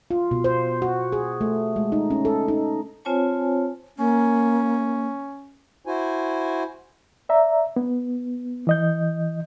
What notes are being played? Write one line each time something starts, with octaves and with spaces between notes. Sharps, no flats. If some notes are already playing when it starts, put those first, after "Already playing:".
F4
B2
C5
F#4
G#4
A3
G#3
D#4
C#4
A4
D#4
C4 F4 C5 C#5 G#5 A5
A#3 C#4
E4 F#4 C5 G#5
D5 E5 A#5
B3
E3 D#5 G6